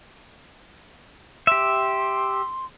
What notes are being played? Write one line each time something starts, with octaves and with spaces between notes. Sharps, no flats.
G4 E5 C6